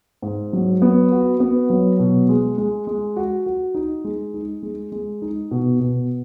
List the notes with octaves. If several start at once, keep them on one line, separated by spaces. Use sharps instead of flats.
G#2
F#3
B3
F#4
B3
F#3
B2
G#3
G#3
G#3
F#4
F#4
D#4
G#3
D#4
G#3
G#3
D#4
B2
B2